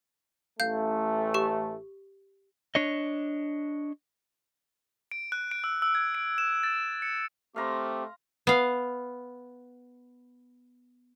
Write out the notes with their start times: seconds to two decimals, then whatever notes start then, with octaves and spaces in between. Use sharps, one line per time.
0.60 A1 A3 F5 G6
1.34 G4 C#6
2.75 D4 C#5 D#5
5.11 D7
5.32 F#6
5.51 D7
5.64 E6
5.82 E6
5.95 G#6
6.15 D7
6.38 E7
6.63 A6
7.02 C#7
7.56 A3 C4 G4 F5 A#5 C6
8.47 B3 F5